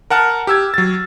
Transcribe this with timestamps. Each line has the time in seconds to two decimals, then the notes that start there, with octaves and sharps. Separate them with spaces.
0.10 A#4 F#5 A5 F6
0.47 G4 E6 G#6
0.74 F#3 A6